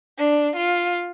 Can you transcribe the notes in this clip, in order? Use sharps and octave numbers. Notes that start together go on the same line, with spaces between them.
D4
F4